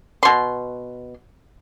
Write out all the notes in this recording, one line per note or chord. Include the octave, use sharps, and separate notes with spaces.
B2 C6